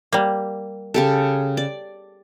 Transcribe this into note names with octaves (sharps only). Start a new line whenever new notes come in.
G3 A#3
C#3 G4 A4
D5